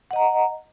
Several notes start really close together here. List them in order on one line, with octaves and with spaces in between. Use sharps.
F#5 D#5 A#5